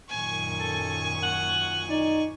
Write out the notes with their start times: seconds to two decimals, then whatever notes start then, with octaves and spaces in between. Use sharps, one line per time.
0.10 F#2 A#2 D#3 G#5 C#6
0.60 A4
1.23 F#5
1.90 D#4 D5